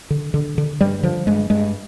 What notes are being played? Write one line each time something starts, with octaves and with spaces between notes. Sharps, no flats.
D3
D3
D3
G2 G3
D3 F3
G2 G#3
G2 G#3